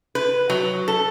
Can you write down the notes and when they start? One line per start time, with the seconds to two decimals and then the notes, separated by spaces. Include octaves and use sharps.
0.15 B4
0.50 F#3
0.88 A4